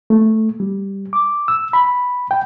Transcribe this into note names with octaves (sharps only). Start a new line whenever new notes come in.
A3
G3
D6
E6
B5
G5